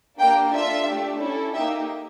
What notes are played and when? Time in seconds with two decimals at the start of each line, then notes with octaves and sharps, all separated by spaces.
0.19 A#3 D4 G4 G5
0.53 D4 F4 A4 E5
0.87 A3 D4 G4
1.20 C#4 E4 A4
1.54 A#3 D#4 G4 E5